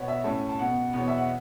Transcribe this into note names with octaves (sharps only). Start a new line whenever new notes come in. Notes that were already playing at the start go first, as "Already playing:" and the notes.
Already playing: B2 B3 C#5
E5
A2 A3 C#4 A5
A5
B2 B3 F#5
E2 B2 B3 C#5
E5
F#5